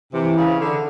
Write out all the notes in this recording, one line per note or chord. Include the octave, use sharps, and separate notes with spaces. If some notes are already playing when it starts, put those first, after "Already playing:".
C3 E3
C#3
D3